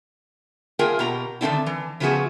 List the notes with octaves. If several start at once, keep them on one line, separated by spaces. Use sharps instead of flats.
A3 A#3 F4 G#4 A#4 G5
B2 G4 A#5
D3 D#3 A3 C4 D4 E4
E3
C#3 F3 A3 B3 F#4 G#4